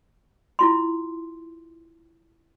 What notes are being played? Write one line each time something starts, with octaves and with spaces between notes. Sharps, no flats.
E4 F4 C6